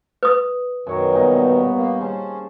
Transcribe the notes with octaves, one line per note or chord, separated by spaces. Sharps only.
B4 D#6
F#2 B2 D#3 C#5 A#5
G2 A#2 B3 D#4
A#3
C#4 G#4 C5 A5